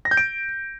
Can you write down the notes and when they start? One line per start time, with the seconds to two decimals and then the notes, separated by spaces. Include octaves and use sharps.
0.05 A#6
0.11 G6
0.17 D7